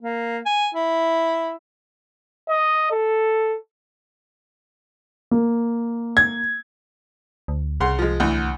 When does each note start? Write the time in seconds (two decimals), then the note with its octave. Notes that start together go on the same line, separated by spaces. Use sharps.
0.02 A#3
0.46 G#5
0.74 E4
2.49 D#5
2.91 A4
5.31 A#3
6.17 G#6
7.48 D2
7.80 C2 C#3 F#5 C6
7.99 F3 G#3
8.20 D2 E3